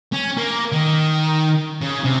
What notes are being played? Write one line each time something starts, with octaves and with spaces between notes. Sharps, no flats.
C#4
A#3
D#3
C#3
C3